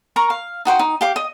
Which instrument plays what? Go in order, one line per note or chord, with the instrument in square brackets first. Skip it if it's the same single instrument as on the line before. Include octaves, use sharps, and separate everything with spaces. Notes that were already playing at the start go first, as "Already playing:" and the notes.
[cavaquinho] A#4 A#5 C#6
F5
D#4 F#4 C5 G5
D#4
G4 F5 D6
D#5